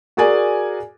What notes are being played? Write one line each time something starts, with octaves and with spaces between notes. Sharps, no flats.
F#4 G#4 A#4 D5 G#5